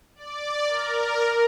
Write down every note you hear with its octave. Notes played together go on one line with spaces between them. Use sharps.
D5
A#4